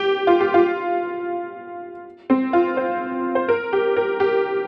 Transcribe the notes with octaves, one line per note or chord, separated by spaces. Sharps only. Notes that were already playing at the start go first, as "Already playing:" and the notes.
Already playing: G4
F4
G4
F4
C4
F4
C5
C5
A#4
G4
A#4
G4